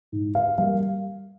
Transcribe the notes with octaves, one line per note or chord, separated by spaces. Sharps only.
G#2
F5
G3 A#3 F5